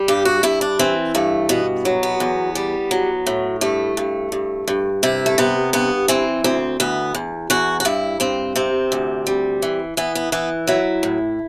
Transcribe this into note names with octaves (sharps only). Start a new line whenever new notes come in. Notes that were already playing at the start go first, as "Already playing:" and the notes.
Already playing: G3
G2 G4
F#4
G2 E4
D4
E3 C4
G2 A3
B2 B3
F#3
B3
E2
G3
F#3
A2
G2 A3
G2
G2
G2
C3 E4
A3
C3 B3
G2 B3
E3 C4
D2 C4
D2 B3
E2
E2 F#4
F#4
G2 E4
G2 C4
C3 C4
D2
G3
E3
E3 B3
B3
E3 B3
F#3 E4
A2